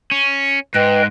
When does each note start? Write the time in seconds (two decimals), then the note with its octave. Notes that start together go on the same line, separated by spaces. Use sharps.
0.11 C#4
0.74 G#2 B4 D#5 G5